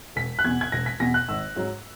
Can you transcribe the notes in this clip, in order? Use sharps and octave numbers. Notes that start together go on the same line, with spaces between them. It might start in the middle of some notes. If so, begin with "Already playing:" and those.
E1 B6
F#6
E2 B2 G#6
G#6
E1 A#6
B6
E2 B2 A#6
F#6
G#1 E6
G#2 F#3